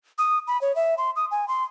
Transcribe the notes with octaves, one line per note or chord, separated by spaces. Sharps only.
D#6
B5
C#5
E5
C6
D#6
G#5
C6